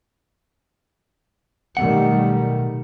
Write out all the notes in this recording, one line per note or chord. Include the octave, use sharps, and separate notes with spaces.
B1 F2 D#3 G3 A3 F#5